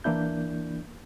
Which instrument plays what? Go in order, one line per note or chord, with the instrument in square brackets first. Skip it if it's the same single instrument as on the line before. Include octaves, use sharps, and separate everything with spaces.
[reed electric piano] E3 A#3 D4 E4 G6